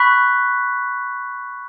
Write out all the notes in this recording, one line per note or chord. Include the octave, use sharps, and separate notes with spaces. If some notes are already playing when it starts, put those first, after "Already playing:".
Already playing: B5 C#6 F#6 B6